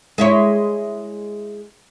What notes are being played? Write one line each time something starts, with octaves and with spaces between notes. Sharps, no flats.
G#3 E4 C#5